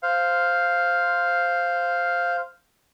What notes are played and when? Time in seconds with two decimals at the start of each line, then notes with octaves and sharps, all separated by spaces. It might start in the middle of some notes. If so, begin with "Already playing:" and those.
0.03 C5 F5